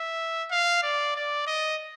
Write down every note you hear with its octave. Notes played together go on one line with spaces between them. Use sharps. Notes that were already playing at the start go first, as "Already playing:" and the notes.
Already playing: E5
F5
D5
D5
D#5